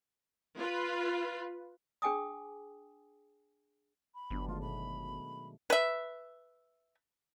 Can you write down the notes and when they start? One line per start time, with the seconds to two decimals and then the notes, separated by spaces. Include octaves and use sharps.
0.57 F4 B4
2.02 D4 G#4 G5 G#5 D6 D#6
4.15 B5
4.31 G1 F#3 B3 D4
4.48 D#3 G#3 A3 F4
4.61 B2 B5
5.70 B4 E5